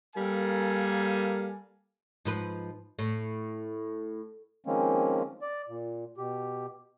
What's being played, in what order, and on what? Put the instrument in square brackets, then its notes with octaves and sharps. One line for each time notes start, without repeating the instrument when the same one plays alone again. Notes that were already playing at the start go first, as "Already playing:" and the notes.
[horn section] G3 A#3 A4 A#4 F5 G#5
[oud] G#2 F3 B4
A2
[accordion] D#3 F3 G#3 A#3 C4 C#4
D5
A#2
B2 G4